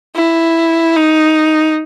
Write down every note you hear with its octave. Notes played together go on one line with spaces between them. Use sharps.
E4
D#4